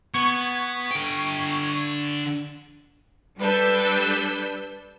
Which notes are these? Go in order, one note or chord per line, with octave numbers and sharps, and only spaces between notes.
B3 C#6 G#6
D3 G5
G3 D4 A4 B4 E6 G6